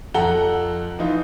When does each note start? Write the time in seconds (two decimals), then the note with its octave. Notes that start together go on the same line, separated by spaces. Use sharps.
0.14 F2 A4 F#5 A#5 G7
0.99 E3 D#4 F4